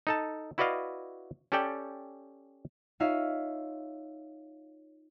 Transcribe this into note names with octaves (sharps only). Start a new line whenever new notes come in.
D#4 A4 A5
E4 F#4 B4 D5 D#5 F5
C#4 G4 A4 D5 G5
D#4 F4 C#5 E5 F5